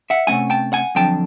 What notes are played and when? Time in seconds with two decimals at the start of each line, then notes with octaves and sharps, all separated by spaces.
0.10 E5 F#5
0.27 C3 F3 A3 C#4 F#5 G#5
0.50 G5 A5
0.73 F#5 G#5
0.95 F2 D3 F#3 G5 A5